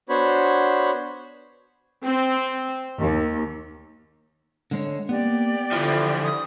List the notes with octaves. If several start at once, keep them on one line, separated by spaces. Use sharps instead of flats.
B3 D4 F#4 C5 C#5 B5
C4
D#2
D3 G#3 C#5
A#3 B3 G4 D5
D3 E3 F3 E5
D5 D#6